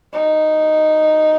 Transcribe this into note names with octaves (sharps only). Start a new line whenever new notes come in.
D#4